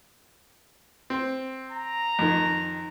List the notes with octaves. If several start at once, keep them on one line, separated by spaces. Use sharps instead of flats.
C4
A#5
F2 D#3